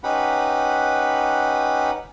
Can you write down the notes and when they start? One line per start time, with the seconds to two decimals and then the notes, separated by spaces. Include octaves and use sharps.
0.04 C#4 D#4 G4 B4 F#5 B5